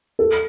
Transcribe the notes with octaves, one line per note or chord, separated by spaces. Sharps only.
A4